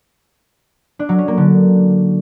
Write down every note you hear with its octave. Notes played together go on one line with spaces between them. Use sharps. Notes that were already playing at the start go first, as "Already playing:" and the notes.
D4
F#3
C#4
A#3
D3